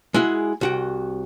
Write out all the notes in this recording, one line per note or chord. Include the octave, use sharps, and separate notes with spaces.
G#3 E4 F#4 G#4
C2 F#4 G5